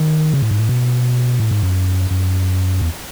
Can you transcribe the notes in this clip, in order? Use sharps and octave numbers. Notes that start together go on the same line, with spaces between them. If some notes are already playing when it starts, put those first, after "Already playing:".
Already playing: D#3
C#3
A2
G#2
A2
B2
A2
G#2
F#2
F#2
E2